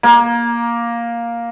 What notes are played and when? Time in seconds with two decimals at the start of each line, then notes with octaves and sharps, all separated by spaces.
0.03 A#3